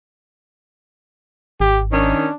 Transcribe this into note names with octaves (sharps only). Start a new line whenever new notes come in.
G#1 G4
D#3 C#4 D4